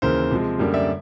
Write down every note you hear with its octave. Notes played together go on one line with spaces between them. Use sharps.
D#2 C#3 E3 A#4 C5
C3 F3 G#3
F#2 D3 G3 A#3
D5 E5